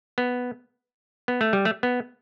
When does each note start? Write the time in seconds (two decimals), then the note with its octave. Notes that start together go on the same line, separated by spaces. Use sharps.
0.18 B3
1.28 B3
1.41 A3
1.53 G3
1.65 A3
1.83 B3